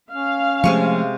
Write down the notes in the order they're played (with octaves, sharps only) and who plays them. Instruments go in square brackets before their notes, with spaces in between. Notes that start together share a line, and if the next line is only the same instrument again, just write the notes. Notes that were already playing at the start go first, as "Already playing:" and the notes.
[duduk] C#4 [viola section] F5
[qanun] C3 G#3 C#6 [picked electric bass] F3 A3